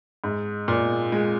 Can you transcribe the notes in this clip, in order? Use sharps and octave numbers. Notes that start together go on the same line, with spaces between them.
G#2
A#2
G#3